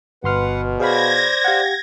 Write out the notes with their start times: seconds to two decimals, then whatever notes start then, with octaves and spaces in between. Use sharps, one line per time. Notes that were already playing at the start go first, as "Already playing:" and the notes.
0.24 G1 B2 B4 F#5 C6 F6
0.80 G#4 C5 D5 F5 B5 G#6 A#6
1.44 G4 F5 F#5